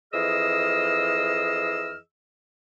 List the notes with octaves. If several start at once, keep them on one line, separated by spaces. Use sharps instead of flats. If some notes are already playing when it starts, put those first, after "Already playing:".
F2 E3 G#4 D#5 E6 F6